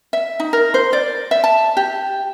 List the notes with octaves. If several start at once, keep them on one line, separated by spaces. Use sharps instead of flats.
E5
D#4
A#4
C5
D5
E5
A5
G4